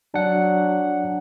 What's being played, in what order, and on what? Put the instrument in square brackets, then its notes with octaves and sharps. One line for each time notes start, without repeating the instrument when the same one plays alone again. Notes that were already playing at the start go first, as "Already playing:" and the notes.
[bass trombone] F#3 [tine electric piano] D4 F#5